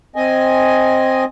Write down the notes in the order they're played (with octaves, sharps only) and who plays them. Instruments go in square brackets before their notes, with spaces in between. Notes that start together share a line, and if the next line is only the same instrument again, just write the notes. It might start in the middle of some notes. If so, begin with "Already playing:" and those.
[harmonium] C4 D#5 G#5